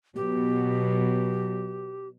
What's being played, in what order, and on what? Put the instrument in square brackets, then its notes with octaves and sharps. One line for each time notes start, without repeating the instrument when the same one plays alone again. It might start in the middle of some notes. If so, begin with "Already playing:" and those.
[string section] B2 F#3 [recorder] G4